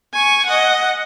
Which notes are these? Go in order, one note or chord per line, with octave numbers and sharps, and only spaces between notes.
G#5 C#6
D#5 F#5